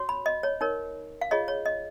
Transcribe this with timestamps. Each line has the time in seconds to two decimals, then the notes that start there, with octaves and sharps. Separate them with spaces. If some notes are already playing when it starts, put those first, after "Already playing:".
Already playing: F#4 C#5
0.09 B5
0.26 D#5
0.43 C#5
0.61 D#4 A#4 C#5
1.21 F5
1.31 F4 G#4 C#5 D#5
1.48 C#5
1.66 D#5